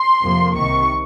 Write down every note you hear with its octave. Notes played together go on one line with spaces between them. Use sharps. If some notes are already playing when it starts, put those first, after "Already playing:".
Already playing: C6
F2 C3 F3 A#3
C2 C3 D#3 C#6